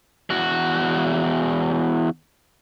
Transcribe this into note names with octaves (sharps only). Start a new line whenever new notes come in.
E2 F#4